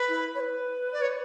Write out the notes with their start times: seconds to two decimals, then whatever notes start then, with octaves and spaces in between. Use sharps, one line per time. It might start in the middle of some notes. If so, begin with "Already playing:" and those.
Already playing: B4
0.09 E4
0.35 C#5
0.40 B4
0.93 D5
1.02 C#5